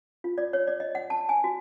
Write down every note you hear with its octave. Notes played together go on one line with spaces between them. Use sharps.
F4
D5
C#5
D5
D#5
F#5
A5
G#5
F#4